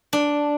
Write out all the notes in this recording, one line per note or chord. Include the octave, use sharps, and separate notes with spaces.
D4